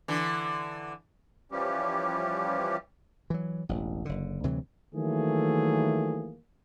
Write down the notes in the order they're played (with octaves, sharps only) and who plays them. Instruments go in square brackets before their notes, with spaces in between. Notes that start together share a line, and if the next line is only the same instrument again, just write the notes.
[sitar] D3 E3
[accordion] E3 F3 G3 C#4 G4
[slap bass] E3 F#3
E1 A1
F#1 D3
D2 C3 E3 F#3
[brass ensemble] D#3 E3 F#3 A3 A#3 G#4